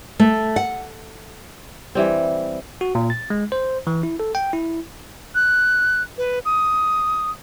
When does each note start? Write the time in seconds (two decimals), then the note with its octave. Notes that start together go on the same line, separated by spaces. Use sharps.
0.19 A3
0.56 F#5
1.95 E3 G3 C4
2.81 F#4
2.95 A#2
3.10 A6
3.30 G#3
3.52 C5
3.87 E3
4.03 E4
4.20 A4
4.35 G5
4.53 E4
5.35 F#6
6.18 B4
6.45 D#6